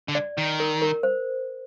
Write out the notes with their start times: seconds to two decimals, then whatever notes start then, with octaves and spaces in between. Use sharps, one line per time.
0.08 D3
0.15 D5
0.38 D#3
0.60 A#4
0.82 A#4
1.03 C5